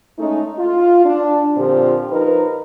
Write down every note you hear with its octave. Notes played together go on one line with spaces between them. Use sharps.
G#3 A3 C#4 D#4
F4
D4
A#2 D3 F3 C4 G4
F3 D#4 A#4 B4